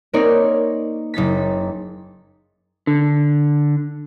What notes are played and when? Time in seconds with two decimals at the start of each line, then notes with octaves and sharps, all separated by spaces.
0.13 A#3 C4 D#4 A#4 C#5 D5
1.14 F#1 D#4 A6 B6
2.87 D3